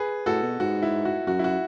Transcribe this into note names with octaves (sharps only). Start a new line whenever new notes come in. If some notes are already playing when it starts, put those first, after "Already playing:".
Already playing: G#4 B4
A2 F#4 A4
B2
G#2 F#4
E4
F#4
F#2 F#4
E4
F#4